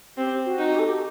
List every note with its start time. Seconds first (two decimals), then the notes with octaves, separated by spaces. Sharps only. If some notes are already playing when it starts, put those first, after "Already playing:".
0.17 C4 G4
0.45 F#4
0.58 D#4
0.72 G4
0.78 A4
0.86 G4